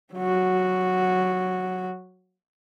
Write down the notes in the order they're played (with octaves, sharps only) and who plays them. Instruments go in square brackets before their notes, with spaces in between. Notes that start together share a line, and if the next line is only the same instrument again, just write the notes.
[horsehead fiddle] F#3 F#4